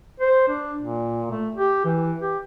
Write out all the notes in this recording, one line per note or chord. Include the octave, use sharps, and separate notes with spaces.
C5
D4
A#2
A3
G4
E3
G4